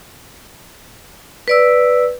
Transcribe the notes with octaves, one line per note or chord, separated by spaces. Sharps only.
B4 D5 E6